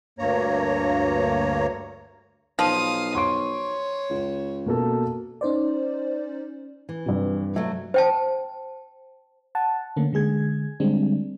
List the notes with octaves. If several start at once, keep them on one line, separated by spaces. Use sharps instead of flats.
D2 G2 A#3 C#5 A#5
B1 F3 F5 D#6
C#5 C6 C#6 D7
C#2
B2 A#3 A4
C#4 D#4 C5 D5
E3
G2 C3
F#3 A3 E5
C5 G5 A5
F#5 A5
D3 A3 A#3 C#4
D3 G#3 G#4 G#6
D3 G3 G#3 C4 D4